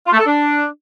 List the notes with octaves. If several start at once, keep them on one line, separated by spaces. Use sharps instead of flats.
F4
A3
A4
D4